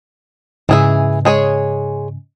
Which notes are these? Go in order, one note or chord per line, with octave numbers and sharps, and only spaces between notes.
G#2 C#3 E3 G#4 E5
G#3 G#4 C#5